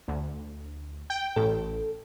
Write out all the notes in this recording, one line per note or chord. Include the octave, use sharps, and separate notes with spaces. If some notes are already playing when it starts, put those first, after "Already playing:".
D2
G5
A1 A4